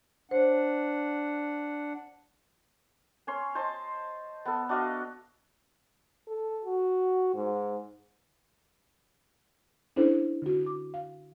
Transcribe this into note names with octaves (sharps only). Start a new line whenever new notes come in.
D4 C5 C#5 F#5
C#4 C#5 C6
C5 D#5 A5 C6
B3 A4
D4 F#4 D#5 F5
A4
F#4
G#2
C#4 D4 E4 A4 C5
D3 F#4
D6
F5